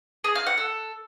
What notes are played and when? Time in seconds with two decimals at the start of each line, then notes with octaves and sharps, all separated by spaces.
0.24 G#4
0.35 F5
0.46 F#5
0.57 A4